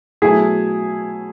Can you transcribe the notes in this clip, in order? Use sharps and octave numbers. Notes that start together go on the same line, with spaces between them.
B2 F#3 A3 E4 G#4